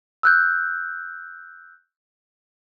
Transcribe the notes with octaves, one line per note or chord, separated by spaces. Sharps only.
E6 F#6 G6